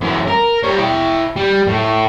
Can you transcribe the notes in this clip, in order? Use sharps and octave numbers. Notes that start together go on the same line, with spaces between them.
F#2 E3
A#4
G3 C#5
E4 G5
G3
A2